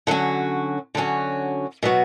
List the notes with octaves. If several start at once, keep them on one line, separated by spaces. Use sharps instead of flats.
D3 F#3 C#4 F#4
D3 F#3 C#4 F#4
B2 F#3 B3 F#4